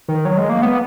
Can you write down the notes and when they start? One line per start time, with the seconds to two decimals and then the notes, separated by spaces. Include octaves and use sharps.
0.08 D#3
0.25 F#3
0.37 G#3
0.50 A#3
0.62 B3